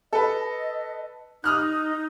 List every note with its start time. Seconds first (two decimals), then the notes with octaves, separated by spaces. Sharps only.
0.13 A4 B4 D#5
1.44 D#4 D#6 F6 F#6